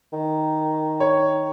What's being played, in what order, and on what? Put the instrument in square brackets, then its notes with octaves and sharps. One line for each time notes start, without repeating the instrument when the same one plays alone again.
[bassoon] D#3
[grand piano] C#5